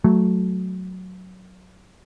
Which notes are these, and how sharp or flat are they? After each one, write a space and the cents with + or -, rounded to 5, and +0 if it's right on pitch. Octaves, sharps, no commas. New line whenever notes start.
F#3 +0 A3 -15